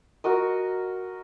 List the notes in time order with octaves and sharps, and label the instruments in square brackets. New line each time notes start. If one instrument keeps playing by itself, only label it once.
[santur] F#4 A#4 D#5